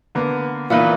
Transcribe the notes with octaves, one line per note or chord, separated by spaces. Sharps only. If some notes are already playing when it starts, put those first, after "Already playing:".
D3 A#3 B3
A#2 E3 B3 D#4 B4